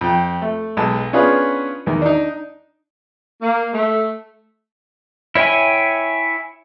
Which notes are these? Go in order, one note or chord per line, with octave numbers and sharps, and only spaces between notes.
F2 G5
A3
B1 G#3 A5
B3 C#4 D4 F4 G#4 B4
E2 D#3
D4 D#4
A#3
A3
E4 C#5 E5 G5 G#5